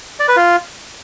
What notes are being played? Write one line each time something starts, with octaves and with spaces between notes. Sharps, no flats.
D5
B4
F4